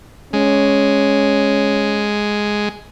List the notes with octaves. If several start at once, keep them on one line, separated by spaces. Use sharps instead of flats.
G#3 C#4